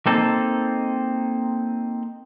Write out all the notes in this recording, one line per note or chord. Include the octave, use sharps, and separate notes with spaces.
A#3 C4 D#4 A4